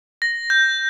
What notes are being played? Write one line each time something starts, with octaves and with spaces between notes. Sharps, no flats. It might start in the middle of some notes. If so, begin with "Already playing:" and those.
A#6
G6